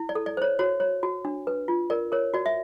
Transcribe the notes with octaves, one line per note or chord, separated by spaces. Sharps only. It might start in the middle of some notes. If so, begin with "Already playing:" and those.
Already playing: E4
D5
A4
D5
C5 C#5
F#4 C#5
C#5
F#4
D4
B4
F4
A#4 D5
A#4 C#5
F#4 D5
E5